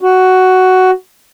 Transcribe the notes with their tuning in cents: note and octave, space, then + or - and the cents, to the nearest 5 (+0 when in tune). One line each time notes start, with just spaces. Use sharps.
F#4 +10